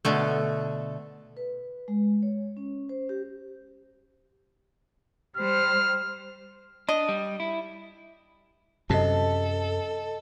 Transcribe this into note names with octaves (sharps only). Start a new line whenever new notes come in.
B2 D3 A3
B4
G#3
C#5
C#4
C5
G4
G3 C5 F6
D4 D#5
G3
E4
F#2 C3 A4 D#5 A5